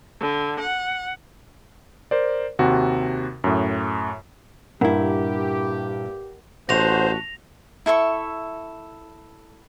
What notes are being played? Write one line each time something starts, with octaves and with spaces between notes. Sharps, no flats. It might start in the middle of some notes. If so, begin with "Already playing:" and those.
D3
F#5
A#4 C5 D5
D#2 C3 F#4
F#2 A2
G2 A#2 E4 G4 A#4 F#5
A1 A3 F#4 C5 A#6 F7
E4 A4 E5 C#6